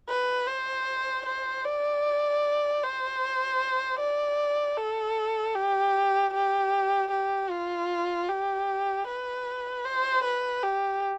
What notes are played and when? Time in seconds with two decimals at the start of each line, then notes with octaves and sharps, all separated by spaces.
0.09 B4
0.47 C5
1.26 C5
1.65 D5
2.83 C5
4.00 D5
4.78 A4
5.55 G4
6.34 G4
7.12 G4
7.50 F4
8.29 G4
9.08 B4
9.85 C5
10.24 B4
10.63 G4